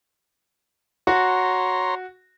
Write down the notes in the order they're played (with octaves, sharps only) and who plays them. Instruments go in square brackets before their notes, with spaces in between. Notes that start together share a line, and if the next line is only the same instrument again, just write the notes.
[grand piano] F#4 [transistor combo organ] C#5 A#5 C6